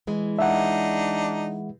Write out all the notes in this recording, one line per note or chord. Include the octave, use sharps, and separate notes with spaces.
E3 G#3
D4 D#4 E5 F#5